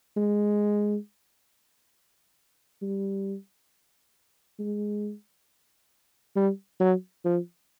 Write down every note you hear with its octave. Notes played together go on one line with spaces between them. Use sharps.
G#3
G3
G#3
G3
F#3
F3